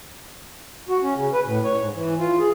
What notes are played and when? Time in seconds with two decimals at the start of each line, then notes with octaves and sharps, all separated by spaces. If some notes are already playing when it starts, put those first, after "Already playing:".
0.89 F#4
1.02 C#4
1.15 C#3
1.33 B4
1.45 A2
1.64 C#5
1.78 G#2
1.94 E3
2.19 F4
2.39 G#4